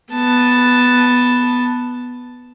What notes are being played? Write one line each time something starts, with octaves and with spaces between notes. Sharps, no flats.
B3 A5